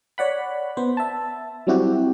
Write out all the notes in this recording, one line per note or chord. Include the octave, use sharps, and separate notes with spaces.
C#5 D5 F#5 B5
B3 C5
E5 A5
F#3 G3 C4 E4 F#4 G4